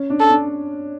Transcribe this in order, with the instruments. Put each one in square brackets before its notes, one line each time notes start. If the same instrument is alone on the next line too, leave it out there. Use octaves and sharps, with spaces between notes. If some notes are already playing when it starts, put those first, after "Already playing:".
Already playing: [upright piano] C#4
D4
[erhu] A4
[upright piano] D4